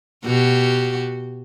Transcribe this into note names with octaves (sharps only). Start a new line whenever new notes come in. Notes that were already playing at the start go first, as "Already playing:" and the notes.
B2 F#4 G4